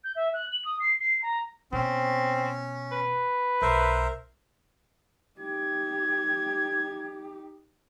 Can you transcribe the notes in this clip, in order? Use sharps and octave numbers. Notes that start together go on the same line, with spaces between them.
G6
E5
F#6
F#7
D#6
C7
C7
A#5
B2 C4 C#4
B4
B1 A#4 C5 E5
D#4 G4 G#6